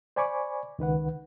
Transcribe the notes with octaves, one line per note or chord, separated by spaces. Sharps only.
C5 D5 G#5 B5 C#6 D6
C#2 D#3 B4 F#5